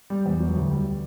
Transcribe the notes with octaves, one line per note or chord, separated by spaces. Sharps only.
G3
E2
F#3
D2
G3